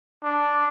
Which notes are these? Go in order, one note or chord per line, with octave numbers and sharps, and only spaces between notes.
D4